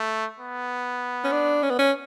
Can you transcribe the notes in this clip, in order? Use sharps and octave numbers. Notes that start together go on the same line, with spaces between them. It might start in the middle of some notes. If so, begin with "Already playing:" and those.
Already playing: A3
B3
C#4
D4
C#4
B3
C#4